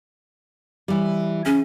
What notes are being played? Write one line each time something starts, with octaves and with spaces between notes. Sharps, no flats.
E3 G3
C#4 G#4 G#5